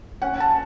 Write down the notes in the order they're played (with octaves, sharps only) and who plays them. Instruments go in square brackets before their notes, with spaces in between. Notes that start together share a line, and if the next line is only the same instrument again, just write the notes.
[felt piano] C#4 F#5
A5